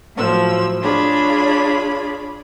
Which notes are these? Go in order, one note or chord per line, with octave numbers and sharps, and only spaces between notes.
A2 F3 F#3 E6
D4 F4 G#4 C#5 B5